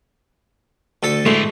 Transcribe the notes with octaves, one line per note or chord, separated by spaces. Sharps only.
D2 A4 A5
A2 E3 G#3 A3